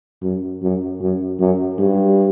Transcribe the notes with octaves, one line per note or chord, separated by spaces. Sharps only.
F#2
F#2
F#2
F#2
G2